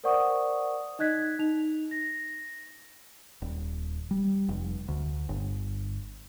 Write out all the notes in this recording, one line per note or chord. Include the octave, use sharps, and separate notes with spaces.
A#4 C5 D5 F#5 C#6 D#6
D#4 D#5 F#6 G#6 B6
D#4 F7
A#6
D#1
G3
F1
D2
G1